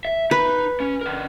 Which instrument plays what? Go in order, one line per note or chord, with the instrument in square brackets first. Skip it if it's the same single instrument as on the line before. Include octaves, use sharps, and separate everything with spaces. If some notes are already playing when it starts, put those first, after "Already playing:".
[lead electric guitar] E5
[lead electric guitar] D#4 [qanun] B4
[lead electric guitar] C#4
D3 A#4